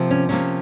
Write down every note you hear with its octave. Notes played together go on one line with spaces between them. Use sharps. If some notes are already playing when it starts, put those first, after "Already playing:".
Already playing: C3 F3 A#3
C#4
C3 F3 A#3 C#4